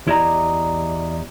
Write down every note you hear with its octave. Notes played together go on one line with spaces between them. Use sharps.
E2 E4 G4 D5 D#5 A#5